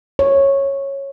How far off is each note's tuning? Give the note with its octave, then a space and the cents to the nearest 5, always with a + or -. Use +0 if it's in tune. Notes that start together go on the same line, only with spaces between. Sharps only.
C#5 -10